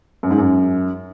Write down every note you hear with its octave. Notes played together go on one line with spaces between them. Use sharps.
F#2
G#2
F#2